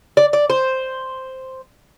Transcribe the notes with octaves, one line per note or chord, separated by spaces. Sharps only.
D5
D5
C5